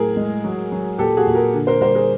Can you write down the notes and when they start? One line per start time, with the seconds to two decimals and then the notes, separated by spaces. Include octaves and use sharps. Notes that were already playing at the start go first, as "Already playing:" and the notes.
Already playing: A2 F#3 G#4 A#4
0.17 G#3
0.44 F#3
0.72 F#3
0.98 A#2 G4 A4
1.17 F#4 G#4
1.26 A#2
1.35 G#4 A#4
1.54 D3
1.67 A#4 C5
1.81 G3 A#4 C5
1.95 G#4 A#4